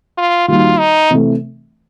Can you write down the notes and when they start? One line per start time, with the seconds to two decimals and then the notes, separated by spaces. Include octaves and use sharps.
0.18 F4
0.48 D#3 G3 A#3 D#4 F4 F#4
0.79 D#4
1.10 C3 E3 A3